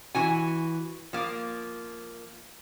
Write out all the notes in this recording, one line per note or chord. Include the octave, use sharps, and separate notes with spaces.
E3 F#4 G#5
F3 A#3